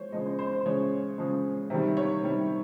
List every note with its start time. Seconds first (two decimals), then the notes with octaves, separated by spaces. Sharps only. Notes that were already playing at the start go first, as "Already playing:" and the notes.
Already playing: F3 G#3 C5 C#5
0.12 C#3 F3 G#3 D#5
0.26 C5
0.39 C5
0.53 C5
0.66 C#3 F3 G#3 C#5
1.18 C#3 F3 G#3
1.70 C3 D#3 G3
1.97 C#5
2.22 C3 D#3 G3